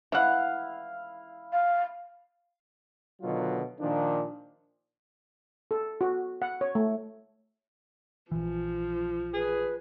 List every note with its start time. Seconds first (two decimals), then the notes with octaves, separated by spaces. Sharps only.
0.12 E3 E4 F5 F#5
1.53 F5
3.22 B2 D3 D#3 F#3 F4
3.80 A#2 D#3 F3 D4
5.71 A4
6.01 F#4
6.42 F#5
6.61 C#5
6.75 A3
8.31 A#1 E3 F3
9.34 G#4 B4